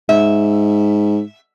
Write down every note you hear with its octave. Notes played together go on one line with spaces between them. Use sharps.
G#2 E5